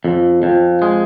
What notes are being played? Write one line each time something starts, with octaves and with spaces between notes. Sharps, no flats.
F2
F2
G#3